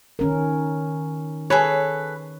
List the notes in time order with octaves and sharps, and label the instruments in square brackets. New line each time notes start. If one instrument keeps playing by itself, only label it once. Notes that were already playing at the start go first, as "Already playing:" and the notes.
[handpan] D#3 C#4 A#4
[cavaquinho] G#4 A4 B4 [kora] C#5